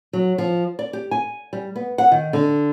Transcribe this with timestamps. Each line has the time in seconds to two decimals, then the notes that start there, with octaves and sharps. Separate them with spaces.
0.13 F#3
0.38 F3
0.79 D5
0.93 G4
1.11 G#5
1.53 G3
1.76 B3
1.98 F#5
2.12 D#3
2.33 D3